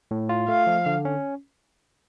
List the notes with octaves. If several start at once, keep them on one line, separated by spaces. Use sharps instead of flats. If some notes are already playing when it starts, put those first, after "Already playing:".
A2
F4
A3 F5
F3
D3
C#4